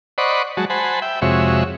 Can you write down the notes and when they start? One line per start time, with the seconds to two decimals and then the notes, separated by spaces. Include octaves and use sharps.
0.18 C5 D5 D#5 F#5 B5 C#6
0.57 F#3 G#3 F#4 A5
0.70 C5 F#5 G#5 A5 B5
1.02 E5 G5
1.22 F2 C3 G#3 F#4 C#5 E5